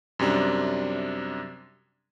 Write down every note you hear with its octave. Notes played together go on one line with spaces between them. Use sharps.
F#2 C3 G3 D4